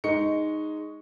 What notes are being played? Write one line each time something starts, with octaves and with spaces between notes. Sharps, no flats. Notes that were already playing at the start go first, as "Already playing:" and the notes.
G#3 D#4 C#6 C#7